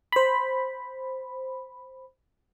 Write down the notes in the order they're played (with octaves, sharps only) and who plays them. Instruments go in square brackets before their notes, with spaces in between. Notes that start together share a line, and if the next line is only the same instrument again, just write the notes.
[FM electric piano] C5 B5